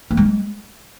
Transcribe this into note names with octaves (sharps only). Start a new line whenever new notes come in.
A#3
G#3